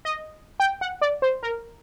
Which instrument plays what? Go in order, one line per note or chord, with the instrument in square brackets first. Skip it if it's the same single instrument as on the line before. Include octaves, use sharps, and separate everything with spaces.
[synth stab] D#5
G5
F#5
D5
C5
A#4